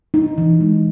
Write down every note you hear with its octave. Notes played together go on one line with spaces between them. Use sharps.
D#4
E3
G#3